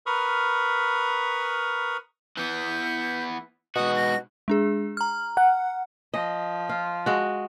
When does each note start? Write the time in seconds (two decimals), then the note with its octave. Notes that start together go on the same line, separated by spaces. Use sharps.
0.06 A#4 B4 B5 C#6 D#6 F6
2.37 E3 B3 G6
3.76 G#2 B2 F#4 D#6
3.96 A#6
4.48 G#3 D4 G#4
4.97 A#5 F6
5.37 F#5
6.14 F3 D#5
6.69 F4
7.06 G#3 F#4